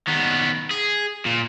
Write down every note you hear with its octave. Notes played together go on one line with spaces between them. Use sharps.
D#3 B3
G#4
A#2